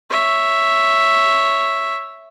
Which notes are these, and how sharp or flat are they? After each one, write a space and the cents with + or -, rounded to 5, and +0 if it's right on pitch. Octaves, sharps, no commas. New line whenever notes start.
C#5 +0 E5 +0